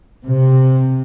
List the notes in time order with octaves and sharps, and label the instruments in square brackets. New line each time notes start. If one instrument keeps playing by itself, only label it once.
[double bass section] C3